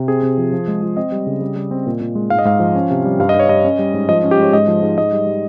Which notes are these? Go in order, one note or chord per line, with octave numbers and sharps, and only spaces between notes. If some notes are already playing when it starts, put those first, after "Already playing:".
Already playing: C3
C4 G#4
C3
F3
F3
G#3
F3
C4 D#5
G3
C#3
G3
G3
C4
A#2
A#2
G#3
G#2 F5
D#5
G#2 F5
F3
C#4
C3
G3
G2 F5
D#5
G2
C#5
G2 D#5
C#4
G3
G#2
F3 D#5
C#4
G4
G#3 C#5
G#2 D#5
F3
G#2
G#2 D#5
G3
G3